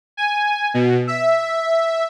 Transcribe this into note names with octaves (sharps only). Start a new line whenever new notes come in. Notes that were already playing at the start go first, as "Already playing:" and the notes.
G#5
B2
E5